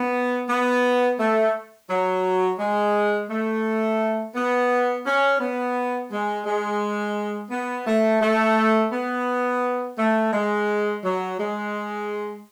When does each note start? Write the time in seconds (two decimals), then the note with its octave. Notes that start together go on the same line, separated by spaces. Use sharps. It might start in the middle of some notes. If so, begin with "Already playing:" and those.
Already playing: B3
0.48 B3
1.19 A3
1.89 F#3
2.59 G#3
3.30 A3
4.35 B3
5.06 C#4
5.40 B3
6.11 G#3
6.46 G#3
7.51 B3
7.86 A3
8.21 A3
8.92 B3
9.98 A3
10.33 G#3
11.03 F#3
11.38 G#3